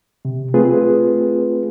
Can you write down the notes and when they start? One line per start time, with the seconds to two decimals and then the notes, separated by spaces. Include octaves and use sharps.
0.25 C3
0.54 A3 C4 F4 G#4 B4